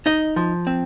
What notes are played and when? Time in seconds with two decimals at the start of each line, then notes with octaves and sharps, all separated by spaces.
0.06 D#4 D#5
0.36 F3
0.67 C4